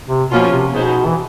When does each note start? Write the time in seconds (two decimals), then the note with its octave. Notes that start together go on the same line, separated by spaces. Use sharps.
0.08 C3
0.30 B2 F3 A#3 C#4 F4
0.51 C3
0.72 B2 B3 D#4 G#4 C5
1.05 E3